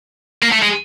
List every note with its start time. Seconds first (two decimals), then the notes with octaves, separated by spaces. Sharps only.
0.43 A#3
0.52 A3
0.63 G#3